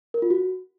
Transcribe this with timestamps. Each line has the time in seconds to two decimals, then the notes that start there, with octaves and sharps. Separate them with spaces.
0.14 A#4
0.22 F4
0.30 F#4